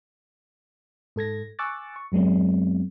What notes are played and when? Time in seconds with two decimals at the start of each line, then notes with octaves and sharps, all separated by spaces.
1.16 G#2 A4 G#6 A#6
1.59 G#5 C#6 D6 E6 F#6 A6
1.96 C#6
2.12 F#2 F#3 G#3 B3 C4